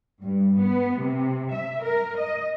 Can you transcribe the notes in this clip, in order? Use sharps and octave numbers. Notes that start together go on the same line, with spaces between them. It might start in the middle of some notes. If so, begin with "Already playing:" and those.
G2
B3
C3
E5
A#4
D#5